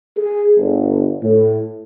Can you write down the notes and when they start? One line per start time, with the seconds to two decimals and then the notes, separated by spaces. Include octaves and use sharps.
0.17 G#4
0.57 G1
1.23 A2